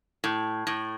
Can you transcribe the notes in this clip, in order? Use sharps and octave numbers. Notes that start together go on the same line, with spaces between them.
A2
A2